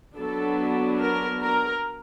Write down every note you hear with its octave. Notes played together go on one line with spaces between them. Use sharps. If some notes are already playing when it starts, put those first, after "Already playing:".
F#3 B3 D4 A4
A#4
A#4